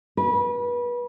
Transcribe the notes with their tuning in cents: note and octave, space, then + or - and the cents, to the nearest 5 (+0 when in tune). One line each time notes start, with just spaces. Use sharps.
B4 -30